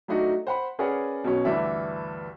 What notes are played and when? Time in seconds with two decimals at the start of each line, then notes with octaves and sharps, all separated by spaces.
0.08 F#3 A3 D4 D#4 F#4
0.47 C5 F#5 B5
0.79 C#4 G#4 A#4 B4 D5 F#5
1.24 B2 F#3 C#4
1.45 D2 G2 E3 D5 E5